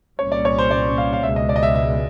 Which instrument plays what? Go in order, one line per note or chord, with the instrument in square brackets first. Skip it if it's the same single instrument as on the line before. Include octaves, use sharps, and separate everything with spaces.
[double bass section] C2 A#2 G3 A#3 C#4 [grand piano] C#5
[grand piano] D5
C#5
C5
D5
F5
F5
[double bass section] C#2 B2 G#3 [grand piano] E5
[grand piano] D#5
D5
D#5
E5
E5